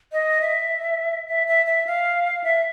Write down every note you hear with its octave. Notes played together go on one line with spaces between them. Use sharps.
D#5
E5
E5
E5
E5
F5
E5